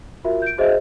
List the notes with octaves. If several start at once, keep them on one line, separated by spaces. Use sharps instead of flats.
F4 F#4 A#4 E5
G6 D7
F#4 G#4 C5 D#5 E5